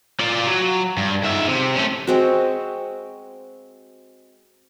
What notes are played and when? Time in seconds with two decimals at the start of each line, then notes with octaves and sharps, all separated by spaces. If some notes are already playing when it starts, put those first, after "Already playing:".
0.20 F4 D5
0.47 F#3
0.97 G2
1.23 G#2 E5
1.48 C3
1.76 A3 C#4
2.07 G#3 C4 F#4